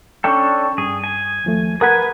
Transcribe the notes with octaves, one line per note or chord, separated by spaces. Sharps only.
C#4 D4 A4 G5 C#6
G2 G#4
G#5
D#2 F3 A3
G#4 A#4 B4 F#5 G#5 G#6